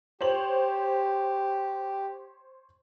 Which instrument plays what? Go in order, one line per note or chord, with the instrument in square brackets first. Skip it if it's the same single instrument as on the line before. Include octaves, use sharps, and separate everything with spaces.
[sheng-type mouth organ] G4 [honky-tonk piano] C5 C#5 F#7